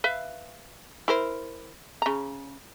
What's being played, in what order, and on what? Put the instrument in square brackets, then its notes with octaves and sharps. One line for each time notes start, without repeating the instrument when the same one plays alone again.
[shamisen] B4 E5 F5
E4 A#4 C5
C#3 A#5